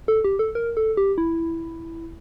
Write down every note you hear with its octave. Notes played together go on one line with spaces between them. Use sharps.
A4
G4
A4
A#4
A4
G4
E4